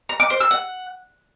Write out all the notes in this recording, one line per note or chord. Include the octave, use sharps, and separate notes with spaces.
A#5
D6
C5
E6
F#5